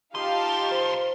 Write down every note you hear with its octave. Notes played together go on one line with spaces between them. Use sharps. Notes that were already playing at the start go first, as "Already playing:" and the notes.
B1 D#4 F4 G4 F5 A5 C6 D#6
C5